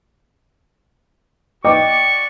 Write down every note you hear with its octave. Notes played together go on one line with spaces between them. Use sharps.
F#4 D5 D#5 G5 C#6 D6